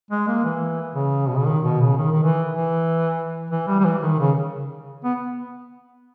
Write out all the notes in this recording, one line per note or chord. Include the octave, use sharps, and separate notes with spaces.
G#3
A#3
E3
C#3
B2
C#3
D#3
B2
C#3
D#3
D#3
E3
E3
E3
G3
G3
E3
D#3
C#3
B3